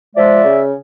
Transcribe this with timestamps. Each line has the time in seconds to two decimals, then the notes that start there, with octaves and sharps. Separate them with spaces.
0.16 F3 G#3 D5 E5
0.44 C#3